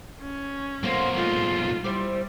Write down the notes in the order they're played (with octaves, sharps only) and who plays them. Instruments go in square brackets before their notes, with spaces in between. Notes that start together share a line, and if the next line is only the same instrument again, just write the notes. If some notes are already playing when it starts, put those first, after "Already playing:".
[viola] C#4
[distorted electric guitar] B1 A#3 [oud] D3 F4 C5
[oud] A3 D#4 G#4 [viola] F4
[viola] G3 [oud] E4 C5 D5